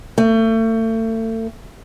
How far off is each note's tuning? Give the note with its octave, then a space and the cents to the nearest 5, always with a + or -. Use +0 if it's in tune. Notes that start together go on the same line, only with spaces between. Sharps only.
A3 +35